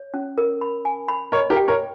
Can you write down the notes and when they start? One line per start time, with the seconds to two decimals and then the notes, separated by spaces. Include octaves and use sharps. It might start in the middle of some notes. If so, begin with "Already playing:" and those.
Already playing: C#5
0.14 C#4
0.38 A#4
0.61 B5
0.85 G#5
1.08 B5
1.32 A#4 C#5 D#5
1.50 G4 A#4
1.56 G5
1.68 A#4 C#5